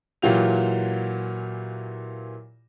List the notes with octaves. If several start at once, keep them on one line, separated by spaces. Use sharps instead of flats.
A#2 E3 F#3 F4 G4 F7